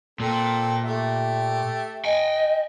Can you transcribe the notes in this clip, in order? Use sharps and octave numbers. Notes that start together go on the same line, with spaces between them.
A#2 C4 A4
A3 G4 E5
D#5 G5 G#5